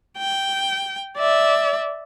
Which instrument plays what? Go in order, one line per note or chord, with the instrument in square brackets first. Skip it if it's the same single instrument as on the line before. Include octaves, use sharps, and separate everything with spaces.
[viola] G5
D5 E5